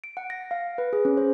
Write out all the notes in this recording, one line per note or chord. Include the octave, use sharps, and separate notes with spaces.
D7
F#5
A#6
F5
B4
G#4
C#4
C5